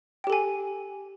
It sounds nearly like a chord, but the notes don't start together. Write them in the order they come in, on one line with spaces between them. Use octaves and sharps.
G5 G4 A4 G#5